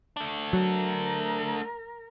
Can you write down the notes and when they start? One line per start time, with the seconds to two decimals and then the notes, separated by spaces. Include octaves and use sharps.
0.17 A3 D4
0.53 F#3 A#4